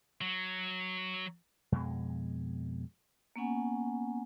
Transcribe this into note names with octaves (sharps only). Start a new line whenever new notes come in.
F#3
F2 B2 G#3
A#3 B3 C#4 F#5 G#5